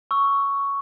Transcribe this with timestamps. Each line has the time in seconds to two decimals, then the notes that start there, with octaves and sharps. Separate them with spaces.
0.11 C#6 E6